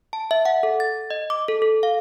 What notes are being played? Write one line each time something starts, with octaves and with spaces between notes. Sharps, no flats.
A5
E5
F#5
A4
A6
D#5
D6
A4
A4
F5